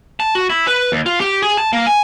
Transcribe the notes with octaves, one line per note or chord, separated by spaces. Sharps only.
A5
F#4
E4
B4
D#2
F4
G4
G#4
A5
A#3
G#5